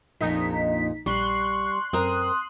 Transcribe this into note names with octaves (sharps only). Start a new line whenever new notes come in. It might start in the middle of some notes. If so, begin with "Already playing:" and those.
A#1 F2 A#2 D#4 B6
A#1 G3 C6 C#6 F#6
F#2 C4 A#4 D#6